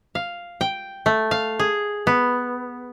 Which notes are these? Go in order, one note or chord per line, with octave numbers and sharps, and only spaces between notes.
F5
G5
A3
F5
G#4
B3